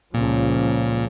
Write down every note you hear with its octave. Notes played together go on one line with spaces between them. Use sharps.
C#2 A#2 C#3 F3